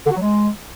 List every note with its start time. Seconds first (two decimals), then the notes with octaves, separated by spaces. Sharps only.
0.06 D3
0.11 F#4
0.16 F#3
0.21 G#3